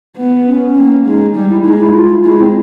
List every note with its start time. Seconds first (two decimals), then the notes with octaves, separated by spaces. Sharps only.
0.17 B3
0.47 C#4
0.76 A#3
1.06 G#3 D#4
1.36 G3
1.50 E4
1.65 G#3 D#4
1.80 E4
1.94 F4
2.24 G#3 E4
2.40 C4